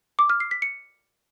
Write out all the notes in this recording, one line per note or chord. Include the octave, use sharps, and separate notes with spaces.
D6
F6
C7
B6
C#7